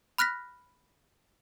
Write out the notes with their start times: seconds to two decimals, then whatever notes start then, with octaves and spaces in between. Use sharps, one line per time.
0.18 B5 F6 F#6 A#6 B6